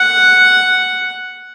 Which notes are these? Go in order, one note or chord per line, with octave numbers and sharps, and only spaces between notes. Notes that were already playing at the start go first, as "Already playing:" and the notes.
Already playing: F#5